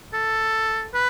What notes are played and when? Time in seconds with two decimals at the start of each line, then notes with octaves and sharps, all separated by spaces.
0.13 A4
0.94 B4